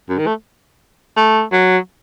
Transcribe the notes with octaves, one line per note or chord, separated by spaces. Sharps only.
F#2
D#3
A3
A3
F#3